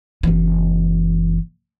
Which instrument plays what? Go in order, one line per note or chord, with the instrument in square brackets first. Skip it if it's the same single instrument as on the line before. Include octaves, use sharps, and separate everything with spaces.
[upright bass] F#1 E3